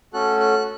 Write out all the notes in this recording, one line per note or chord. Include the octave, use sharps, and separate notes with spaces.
A3 C#4 F#4 A4 F#6
F#6